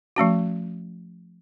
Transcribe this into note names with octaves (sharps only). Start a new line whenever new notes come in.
F3 A3 C#4 F#4